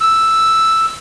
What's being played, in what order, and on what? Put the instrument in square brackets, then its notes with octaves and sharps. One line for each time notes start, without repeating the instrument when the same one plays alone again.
[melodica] E6